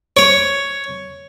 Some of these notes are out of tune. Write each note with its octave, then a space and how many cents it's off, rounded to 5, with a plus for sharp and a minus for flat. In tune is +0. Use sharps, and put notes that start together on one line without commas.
C#5 +5